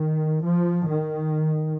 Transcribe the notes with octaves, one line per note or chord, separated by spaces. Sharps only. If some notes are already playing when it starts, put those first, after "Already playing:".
Already playing: D#3
F3
D#3